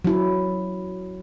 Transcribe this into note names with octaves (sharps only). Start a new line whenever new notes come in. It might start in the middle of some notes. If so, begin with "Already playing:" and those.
F#3 E4